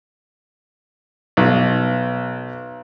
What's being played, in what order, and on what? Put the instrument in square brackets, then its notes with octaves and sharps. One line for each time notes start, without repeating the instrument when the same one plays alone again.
[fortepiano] B1